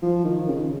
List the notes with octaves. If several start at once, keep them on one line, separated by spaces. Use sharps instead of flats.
F3
D#3
C#3